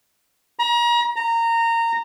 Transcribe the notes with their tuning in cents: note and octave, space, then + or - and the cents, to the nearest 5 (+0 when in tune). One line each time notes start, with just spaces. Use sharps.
A#5 +35
A#5 -20